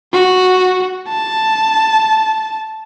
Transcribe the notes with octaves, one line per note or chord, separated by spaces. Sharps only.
F#4
A5